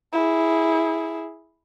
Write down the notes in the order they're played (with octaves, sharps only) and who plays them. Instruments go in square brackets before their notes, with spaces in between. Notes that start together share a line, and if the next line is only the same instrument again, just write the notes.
[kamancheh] E4 G#4